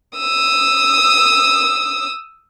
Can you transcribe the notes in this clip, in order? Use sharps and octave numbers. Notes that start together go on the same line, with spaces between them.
D#6 E6